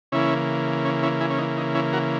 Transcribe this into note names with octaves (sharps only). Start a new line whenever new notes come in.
C#3 E3 A#3 C#4 E4
C#4
C#4 E4
E4 G#4
C#4
D#4
D#4
C#4 E4
F#4 A#4